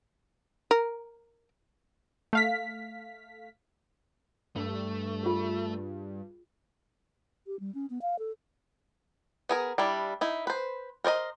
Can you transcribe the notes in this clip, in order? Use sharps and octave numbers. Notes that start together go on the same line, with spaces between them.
A#4
A3 F5 B6
G2 A3
F4 G#4
G4
G3
C#4
B3
F5
A4
B3 G#4 A#4
G3 D4 E4
D#4 E4
B4 C5
A#4 C5 D5 D#5